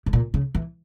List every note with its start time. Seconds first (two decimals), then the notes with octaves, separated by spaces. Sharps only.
0.06 G#2
0.13 A#2
0.34 C#3
0.55 E3